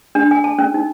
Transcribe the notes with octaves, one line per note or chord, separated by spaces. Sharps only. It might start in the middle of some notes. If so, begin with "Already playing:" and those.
D4
G#5
A5
C#4
D#4